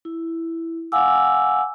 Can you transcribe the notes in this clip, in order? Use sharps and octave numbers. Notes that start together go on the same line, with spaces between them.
E4
F5 F#5 G#5 D6 E6